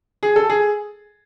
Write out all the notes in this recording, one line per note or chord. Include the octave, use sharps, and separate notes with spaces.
G#4
A4
G#4